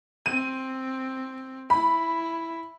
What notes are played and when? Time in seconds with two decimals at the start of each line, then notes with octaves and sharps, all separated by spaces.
0.26 C4 D#7
1.70 E4 B5